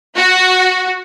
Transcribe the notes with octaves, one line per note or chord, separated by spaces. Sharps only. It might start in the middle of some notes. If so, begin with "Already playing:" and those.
F#4